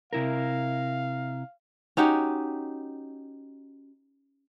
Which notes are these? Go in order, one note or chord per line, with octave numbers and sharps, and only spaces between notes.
C3 E4 A#4 F5
C#4 D#4 F#4 G4